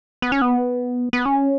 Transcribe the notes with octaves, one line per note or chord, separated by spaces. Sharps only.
B3
C#4
B3
B3
C#4